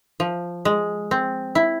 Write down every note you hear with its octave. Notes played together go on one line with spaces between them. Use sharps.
F3
G#3
C4
E4